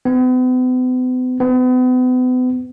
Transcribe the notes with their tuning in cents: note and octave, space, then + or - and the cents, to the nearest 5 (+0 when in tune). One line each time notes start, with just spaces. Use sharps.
B3 +45
B3 +40